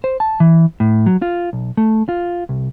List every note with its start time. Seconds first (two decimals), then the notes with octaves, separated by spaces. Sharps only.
0.04 C5
0.20 A5
0.40 E3
0.80 A2
1.06 F#3
1.22 F4
1.53 B1
1.77 A3
2.09 F4
2.49 C2